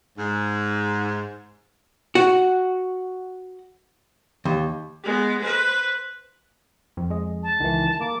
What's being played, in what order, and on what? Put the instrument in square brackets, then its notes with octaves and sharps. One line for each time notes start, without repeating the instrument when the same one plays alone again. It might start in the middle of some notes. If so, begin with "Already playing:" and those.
[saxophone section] G#2
[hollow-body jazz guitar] F#4
D#2
[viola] G#3 B3
B4 C5
[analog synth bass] F2
[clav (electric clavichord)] G#3 D#5
[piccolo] A5
[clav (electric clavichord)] C#2 E3 [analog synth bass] D#3
[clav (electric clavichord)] A#3 [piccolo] D6